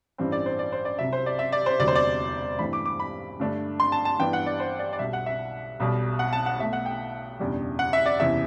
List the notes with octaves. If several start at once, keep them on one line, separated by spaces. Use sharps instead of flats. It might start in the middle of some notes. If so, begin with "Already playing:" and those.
A1 G2 E3 G3 C4
D5
C5
D5
C5
D5
C2 C3 F#3 E5
C5
D5
E5
D5
C5
E1 D2 C3 F#3 D5
C5
D5
G2 E3 A3 C4 B5
D6
D6
B5
G2 D3 A3 D4
C6
A5
A5
G2 E3 G3 B3 D4 G5
F#5
D5
C5
D5
D5
B1 B2 G3 E5
F#5
E5
B1 B2 G3
F#5
A5
F#5
B1 B2 A3 E5
F#5
G5
F#1 E2 B2 G3 D4
F#5
E5
D5
F#1 E2 C3 E3 E5